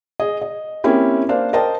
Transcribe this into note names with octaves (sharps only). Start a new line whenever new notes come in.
G#4 D#5
D#5
A#3 C4 C#4 E4 G4
A#3 D4 C5 F5
A#4 C5 D5 D#5 G5 A5